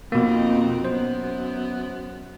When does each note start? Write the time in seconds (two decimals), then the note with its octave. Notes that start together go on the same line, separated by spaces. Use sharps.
0.12 F2 B2 A#3 C4 D#4
0.85 F#2 B3 C5